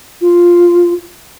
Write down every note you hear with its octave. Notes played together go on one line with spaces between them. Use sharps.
F4